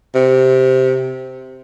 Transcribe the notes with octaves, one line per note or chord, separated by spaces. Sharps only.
C3